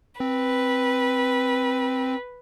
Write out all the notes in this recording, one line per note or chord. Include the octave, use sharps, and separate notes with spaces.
C4 B4